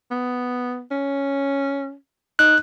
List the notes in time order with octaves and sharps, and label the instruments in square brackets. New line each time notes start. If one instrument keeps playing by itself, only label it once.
[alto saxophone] B3
C#4
[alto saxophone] D#4 [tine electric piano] F#6